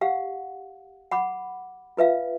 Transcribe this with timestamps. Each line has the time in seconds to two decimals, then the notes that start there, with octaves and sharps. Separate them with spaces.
0.01 G4 F5 F#5
1.11 F#5 B5 D6
1.97 F4 B4 E5 F5